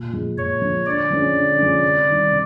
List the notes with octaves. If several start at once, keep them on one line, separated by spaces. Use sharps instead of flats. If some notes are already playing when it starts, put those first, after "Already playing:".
Already playing: A#2
F3 G#3
A#2 C#5
F3 G#3
D3 D5
F3 G#3 C#4
D3
F3 G#3 C#4
C3
D#3 G3
C3